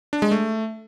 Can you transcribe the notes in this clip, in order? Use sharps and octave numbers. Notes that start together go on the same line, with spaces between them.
D4
G#3
A3